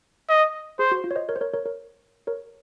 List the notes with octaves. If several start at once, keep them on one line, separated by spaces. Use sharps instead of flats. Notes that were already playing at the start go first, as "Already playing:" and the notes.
D#5
G#4 C5
F#4
F4
C#5
C5 D#5
A#4 C#5
C5
A#4 C#5
A#4 C#5
A#4 C#5
A#4 C#5